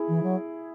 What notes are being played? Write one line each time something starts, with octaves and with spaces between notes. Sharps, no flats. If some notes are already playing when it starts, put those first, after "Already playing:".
Already playing: E4 G#4
E3
F#3